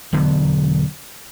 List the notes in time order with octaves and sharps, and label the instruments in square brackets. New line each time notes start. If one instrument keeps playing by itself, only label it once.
[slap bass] E1 D3 F#3 B3